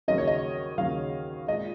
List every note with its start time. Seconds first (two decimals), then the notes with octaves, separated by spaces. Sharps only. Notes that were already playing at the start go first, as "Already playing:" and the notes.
0.08 D#2 C#3 F#3 D#5
0.18 C#5
0.27 D#5
0.78 D#2 C#3 F#3 F5
1.48 A#2 G#3 D#5